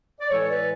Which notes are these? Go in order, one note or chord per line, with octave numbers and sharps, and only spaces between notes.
D5
A2 E3 G#3 A4 C#5
B4 D5